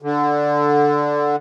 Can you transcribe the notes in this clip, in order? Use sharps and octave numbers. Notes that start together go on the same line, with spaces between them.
D3